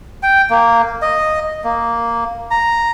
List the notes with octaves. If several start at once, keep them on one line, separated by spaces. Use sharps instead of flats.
G5
A#3
D#5
A#3
A#5